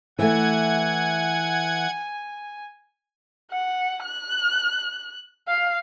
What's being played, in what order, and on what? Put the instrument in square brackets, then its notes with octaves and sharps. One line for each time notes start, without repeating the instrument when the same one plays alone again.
[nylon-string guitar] E3 A3 [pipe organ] F#5 G#6 [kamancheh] G#5
[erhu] F#5
F#6
F5